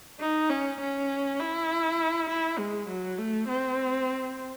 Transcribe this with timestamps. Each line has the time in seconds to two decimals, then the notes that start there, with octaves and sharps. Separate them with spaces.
0.20 D#4
0.50 C#4
0.80 C#4
1.40 E4
2.29 E4
2.58 G#3
2.88 F#3
3.19 A3
3.48 C4